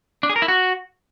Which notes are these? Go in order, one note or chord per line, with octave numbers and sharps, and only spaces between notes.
D4
G#4
A#4
E4
F#4